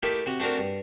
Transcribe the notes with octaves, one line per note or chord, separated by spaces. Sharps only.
A3 A#3 D#4 E4 G4
C3 F#4
A3 C4 D4 F#4 A#4
G2